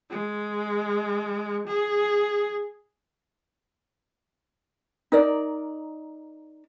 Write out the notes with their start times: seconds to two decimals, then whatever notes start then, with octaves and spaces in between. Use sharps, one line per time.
0.11 G#3
1.68 G#4
5.12 D#4 A#4 D5